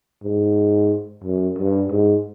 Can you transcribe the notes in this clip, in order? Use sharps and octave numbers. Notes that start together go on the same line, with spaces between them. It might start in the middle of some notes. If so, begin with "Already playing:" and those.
G#2
F#2
G2
G#2